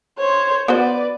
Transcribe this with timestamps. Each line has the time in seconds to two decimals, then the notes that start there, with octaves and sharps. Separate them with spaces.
0.18 C5 C#5
0.68 B3 F#4 B4 C5 D5